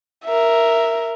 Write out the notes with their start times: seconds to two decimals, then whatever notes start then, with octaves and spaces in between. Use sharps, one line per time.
0.25 A#4 E5